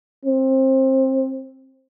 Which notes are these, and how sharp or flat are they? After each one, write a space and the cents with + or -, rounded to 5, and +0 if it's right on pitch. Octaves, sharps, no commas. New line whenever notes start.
C4 +20